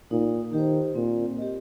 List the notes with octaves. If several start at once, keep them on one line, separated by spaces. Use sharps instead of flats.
A#2 D#4
D#3 G4 C5
A#2 C4
G4 D#5